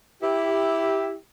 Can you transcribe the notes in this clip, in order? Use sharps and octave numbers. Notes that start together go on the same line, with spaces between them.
E4 G4